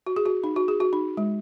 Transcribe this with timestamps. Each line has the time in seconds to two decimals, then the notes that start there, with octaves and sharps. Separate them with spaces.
0.06 F#4
0.16 G#4
0.26 F#4
0.44 D#4
0.56 F#4
0.68 G#4
0.80 F#4
0.93 D#4
1.17 G#3